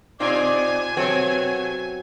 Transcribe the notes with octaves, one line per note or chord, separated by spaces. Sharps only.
B2 C4 D#4 F4 D5 G#5 D6
B2 F#3 A3 B3 C4 A4 C#5